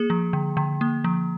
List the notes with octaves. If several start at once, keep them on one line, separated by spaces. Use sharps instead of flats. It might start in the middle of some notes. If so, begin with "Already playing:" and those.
Already playing: A#3 G#4
F3
D3
D3
A#3
F3